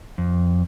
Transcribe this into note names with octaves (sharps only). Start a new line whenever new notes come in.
F2